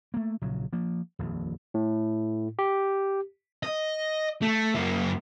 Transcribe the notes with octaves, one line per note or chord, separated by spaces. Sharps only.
A3 A#3
A#1 C#3 F#3
F3 A#3
D#1 A#1 F2
A2
G4
D#5
A3
F#2 A#3